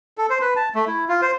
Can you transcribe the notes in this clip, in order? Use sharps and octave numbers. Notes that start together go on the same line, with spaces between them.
A4
C5
B4
A5
A3
E4
F4
C5